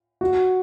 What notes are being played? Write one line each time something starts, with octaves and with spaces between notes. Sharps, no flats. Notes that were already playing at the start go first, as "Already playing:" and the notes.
F#4